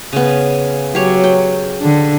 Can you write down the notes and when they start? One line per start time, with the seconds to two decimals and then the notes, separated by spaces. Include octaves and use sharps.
0.13 C#3 B3
0.95 F#3 G4 C#5
1.24 G5
1.81 D3